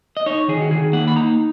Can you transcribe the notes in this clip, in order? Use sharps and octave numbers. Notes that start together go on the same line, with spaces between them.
D#5
D#4 C#5
D#3 G#4
F#4
D#3 G#4
A#3 F#5
B5
D#4 A#5